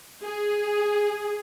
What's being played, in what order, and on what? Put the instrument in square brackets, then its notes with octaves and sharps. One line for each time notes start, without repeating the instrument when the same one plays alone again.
[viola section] G#4